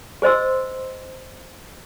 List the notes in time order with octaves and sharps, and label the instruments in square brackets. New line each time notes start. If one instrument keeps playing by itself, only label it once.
[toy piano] G#4 C5 D#5 C6 E6